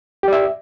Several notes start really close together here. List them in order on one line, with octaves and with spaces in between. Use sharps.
G4 D5 E5